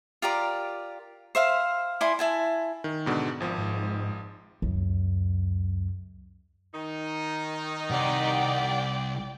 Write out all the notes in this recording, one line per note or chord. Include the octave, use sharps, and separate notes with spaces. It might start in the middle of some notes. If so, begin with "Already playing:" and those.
F4 G4 A#4 D5
C5 E5 F5
E4 D5 G#5 C6
E4 G#5 A5
D#3
G#2 B2 D3
G#1 F3
G#2
C#2 F#2
D#3 D#4
C2 G4 D5 F#5 G5